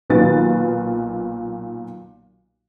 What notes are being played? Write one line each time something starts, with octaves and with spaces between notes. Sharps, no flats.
B1 A#2 D#3 B4 A6